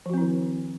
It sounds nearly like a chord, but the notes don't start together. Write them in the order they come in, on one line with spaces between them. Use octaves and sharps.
F3 F#4 C4 E4 D#3